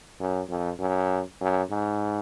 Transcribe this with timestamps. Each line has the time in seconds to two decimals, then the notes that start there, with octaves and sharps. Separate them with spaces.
0.20 F#2
0.49 F2
0.79 F#2
1.41 F#2
1.70 G#2